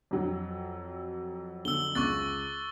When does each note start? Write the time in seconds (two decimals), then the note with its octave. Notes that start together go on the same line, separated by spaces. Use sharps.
0.11 F2 F#3
1.65 D3 E6 G7
1.95 C#2 C#6 D6 F#6 A6